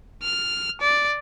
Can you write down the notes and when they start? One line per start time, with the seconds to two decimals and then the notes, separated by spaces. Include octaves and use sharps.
0.23 F6
0.81 D5